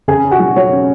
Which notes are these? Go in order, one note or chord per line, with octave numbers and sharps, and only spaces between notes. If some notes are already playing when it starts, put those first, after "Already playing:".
C#3 G#4 G#5
C#4
F#4 F#5
F#3
F#3 C#5
C#4